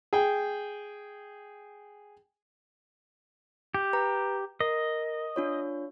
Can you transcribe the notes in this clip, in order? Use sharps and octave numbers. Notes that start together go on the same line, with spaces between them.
G#4 G5
G4
B4 A#5
A#4 D#5
D4 F4 C#5